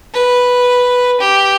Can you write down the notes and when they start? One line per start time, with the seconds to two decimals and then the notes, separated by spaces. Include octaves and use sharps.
0.14 B4
1.20 G4